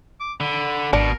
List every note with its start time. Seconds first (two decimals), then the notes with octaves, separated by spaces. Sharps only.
0.20 D6
0.40 D3 B5
0.93 G#1 B2 D4 A#4